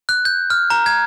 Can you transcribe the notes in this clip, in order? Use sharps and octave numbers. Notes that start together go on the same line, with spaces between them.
F#6
G6
F6
A#5
G#6